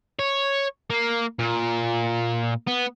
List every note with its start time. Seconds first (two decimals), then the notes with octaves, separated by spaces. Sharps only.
0.19 C#5
0.90 A#3
1.39 A#2
2.67 B3